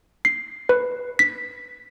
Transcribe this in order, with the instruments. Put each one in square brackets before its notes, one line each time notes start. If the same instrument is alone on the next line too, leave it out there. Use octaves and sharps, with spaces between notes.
[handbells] C7
B4
B6